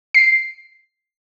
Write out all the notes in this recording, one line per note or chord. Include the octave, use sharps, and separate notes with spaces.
C7